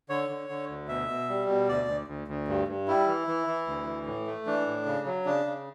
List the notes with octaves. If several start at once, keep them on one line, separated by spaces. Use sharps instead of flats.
D3 C#5
D3
D3
D2
B2 E5
B2
G3
B2
D2 D5
D2
D2
D2
G2
G2
G3 E4
E3
E3
E3
D2
E3
A2
A3
E3 D4
A2
C#3
F#3
C#3 D4
C#3